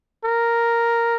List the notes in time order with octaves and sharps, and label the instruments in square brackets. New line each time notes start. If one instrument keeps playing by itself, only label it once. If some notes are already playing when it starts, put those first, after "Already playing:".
[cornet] A#4